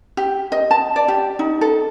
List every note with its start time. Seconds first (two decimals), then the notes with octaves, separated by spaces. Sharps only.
0.17 G4
0.52 D#5
0.71 A5
0.96 D5
1.08 G4
1.39 D#4
1.61 A4